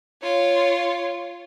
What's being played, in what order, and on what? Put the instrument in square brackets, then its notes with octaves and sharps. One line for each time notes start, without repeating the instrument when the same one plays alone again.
[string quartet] F4 C#5